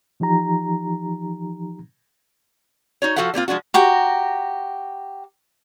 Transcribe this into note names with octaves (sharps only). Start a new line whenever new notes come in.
E3 F3 D#4 G4 A#5
D#4 F#4 C#5
F3 C#4 F#4 A4 F5 F#5
G3 A#3 C4 F4
F3 G#3 D4 F#4
F#4 G4 A#5